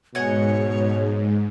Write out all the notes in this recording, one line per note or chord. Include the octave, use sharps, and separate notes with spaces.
G#2 B2 C#5 D#5 F#5 G#5